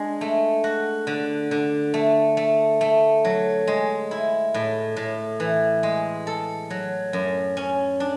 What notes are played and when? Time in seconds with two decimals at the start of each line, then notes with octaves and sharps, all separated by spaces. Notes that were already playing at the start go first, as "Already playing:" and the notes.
Already playing: G#3 D4
0.21 A3
0.64 F#4
1.07 D3
1.51 D3
1.94 A3
2.37 A3
2.81 A3
3.25 F#3
3.67 G#3
4.11 E4
4.54 A2
4.97 A2
5.40 E3
5.83 G#3
6.27 A4
6.70 F#3
7.13 F#2
7.57 C#4
8.00 D4